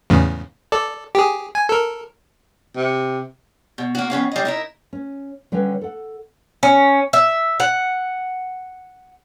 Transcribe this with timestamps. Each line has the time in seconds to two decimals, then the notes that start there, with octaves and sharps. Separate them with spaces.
0.10 E2 A2 C#3
0.72 A4 D5
1.15 G4 G#4
1.55 G#5
1.69 A4 A#4
2.76 C3
3.78 B2
3.95 A#3 F#4
4.10 F2 B3 C#4 F5
4.32 G3 D#5
4.45 D#4 E4 A#4
4.93 C#4
5.52 D3 G3 C#4 B4 C#5
5.81 A4 F#5
6.63 C#4
7.13 E5
7.60 F#5